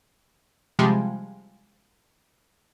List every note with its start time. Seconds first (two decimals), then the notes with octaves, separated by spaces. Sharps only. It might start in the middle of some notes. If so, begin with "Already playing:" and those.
0.79 C3 F3 G3 G#3